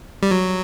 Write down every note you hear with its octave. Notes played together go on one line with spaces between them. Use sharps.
G3
F#3